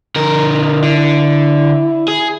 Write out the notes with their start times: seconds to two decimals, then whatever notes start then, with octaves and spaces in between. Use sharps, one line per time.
0.16 D3 A#4
0.83 D3 E4
2.08 G#4